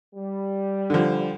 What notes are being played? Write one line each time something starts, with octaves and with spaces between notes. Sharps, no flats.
G3
D3 F3